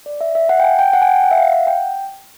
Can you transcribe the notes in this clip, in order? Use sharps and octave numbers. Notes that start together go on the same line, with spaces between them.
D5
E5
E5
F#5
G5
G#5
G5
F#5
G#5
G5
F#5
E5
F5
F#5
G5